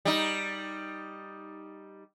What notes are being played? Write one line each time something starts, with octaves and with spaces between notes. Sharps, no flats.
G3 D#4